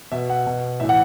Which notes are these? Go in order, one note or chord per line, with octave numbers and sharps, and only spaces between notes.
B2 E5
F#5
B2
A2 E3 E5
F#5